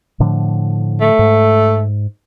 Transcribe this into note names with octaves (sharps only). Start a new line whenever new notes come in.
A2 D3 F3
A3
G#2